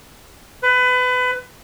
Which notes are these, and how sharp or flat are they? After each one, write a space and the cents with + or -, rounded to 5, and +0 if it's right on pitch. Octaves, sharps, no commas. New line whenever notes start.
B4 +25